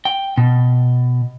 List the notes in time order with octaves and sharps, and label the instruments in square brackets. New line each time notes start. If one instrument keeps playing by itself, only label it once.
[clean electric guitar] G5
B2